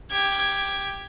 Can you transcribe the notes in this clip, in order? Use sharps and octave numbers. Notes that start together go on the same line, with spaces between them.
G4 G#6